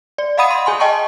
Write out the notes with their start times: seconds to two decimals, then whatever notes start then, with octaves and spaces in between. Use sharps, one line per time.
0.18 D5
0.37 D#5 F5 F#5 B5 D#6 D#7
0.50 C6
0.66 G#4 G#5 C6
0.80 D#5 G5 A5 C#6